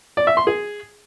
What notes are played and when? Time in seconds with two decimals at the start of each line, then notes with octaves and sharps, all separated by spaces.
0.17 D5
0.27 E5
0.37 C6
0.47 G#4